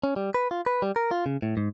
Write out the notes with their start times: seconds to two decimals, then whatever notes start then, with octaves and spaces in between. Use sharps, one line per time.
0.04 C#4
0.16 G3
0.34 B4
0.51 F4
0.66 B4
0.82 G3
0.96 A#4
1.11 F4
1.26 C#3
1.42 A2
1.57 G#2